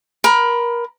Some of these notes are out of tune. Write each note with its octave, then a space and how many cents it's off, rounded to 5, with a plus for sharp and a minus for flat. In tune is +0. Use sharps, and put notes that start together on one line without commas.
A#4 +25 B5 +20